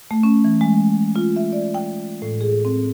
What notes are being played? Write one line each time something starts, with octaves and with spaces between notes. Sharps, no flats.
A3
C#4
E3
G#3
F4
E5
D5
G5
A2
G#4
C4